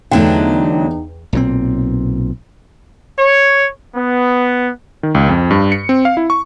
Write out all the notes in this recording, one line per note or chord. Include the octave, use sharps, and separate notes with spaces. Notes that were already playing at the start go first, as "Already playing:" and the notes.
E2 D3 F#3 A3 D#4 G5
B1 A#2 C4
C#5
B3
D#3
C#2
F2
G2
C#7
C4
F5
E4
C#6